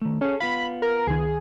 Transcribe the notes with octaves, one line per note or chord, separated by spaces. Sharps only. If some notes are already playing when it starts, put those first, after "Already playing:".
D#3 A3
C#4 G#4 A4
B3 F4 F5 B5
A#4
C#2 D#3 G#4